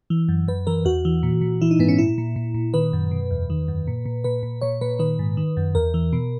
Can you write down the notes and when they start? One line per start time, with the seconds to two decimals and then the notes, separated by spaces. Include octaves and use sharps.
0.10 E3
0.28 F#2
0.48 F#2 B4
0.67 E3 A#4
0.85 E2 F#4
1.05 E3
1.23 A#2
1.41 A#2
1.61 E3 E4
1.71 D#4
1.79 G#2 B3
1.89 C#4
1.98 A#2 E4
2.18 A#2
2.36 A#2
2.54 A#2
2.74 D#3 B4
2.93 F#2
3.11 B2
3.31 E2
3.50 D#3
3.68 F#2
3.87 A#2
4.06 A#2
4.24 A#2 B4
4.43 A#2
4.61 A#2 C#5
4.81 A#2 B4
4.99 D#3 B4
5.19 G#2
5.37 D#3
5.57 F#2
5.75 E2 A#4
5.94 E3
6.13 B2